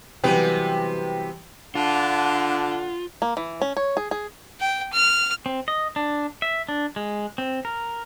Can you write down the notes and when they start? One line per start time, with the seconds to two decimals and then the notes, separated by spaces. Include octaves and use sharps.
0.24 C3 E3 F#3 G3 B3 B4 G5
1.75 D3 D4 F4 F#5
3.22 A#3
3.37 E3
3.62 C#4
3.77 C#5
3.97 G#4
4.11 G#4
4.60 G5
4.93 F6
5.46 C4
5.68 D#5
5.96 D4
6.42 E5
6.69 D4
6.96 G#3
7.38 C4
7.65 A#4